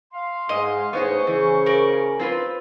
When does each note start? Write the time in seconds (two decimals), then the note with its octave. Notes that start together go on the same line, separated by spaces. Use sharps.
0.13 F5 C6
0.49 G#2 D#5
0.93 A2 C#3 B3 D#4 G#4 C5 C#6
1.27 C#3 E3 G#4
1.66 A#4 D5
2.19 C4 F4 B4